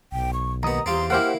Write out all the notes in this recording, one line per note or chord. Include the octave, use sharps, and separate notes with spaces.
B1 G5
C#6
D#2 B3 D#5 A#5 D#6
E2 C4 F4 G4 C6
A#3 E4 G4 C5 F#5 F6